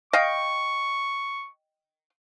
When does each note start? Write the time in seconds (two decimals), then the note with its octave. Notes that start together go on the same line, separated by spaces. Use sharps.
0.13 D#5 F5 G5 C#6